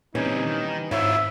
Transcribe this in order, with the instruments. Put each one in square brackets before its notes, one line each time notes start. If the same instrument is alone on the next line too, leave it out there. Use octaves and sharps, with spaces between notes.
[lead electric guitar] A#2 C4 [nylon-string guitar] E3 G3 C#4 [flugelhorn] D#4
[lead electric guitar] D#3
[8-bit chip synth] G#2 [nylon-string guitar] C4 C#5 [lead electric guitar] E4 F4 [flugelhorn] E5